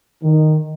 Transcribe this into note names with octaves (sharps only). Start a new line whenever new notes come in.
D#3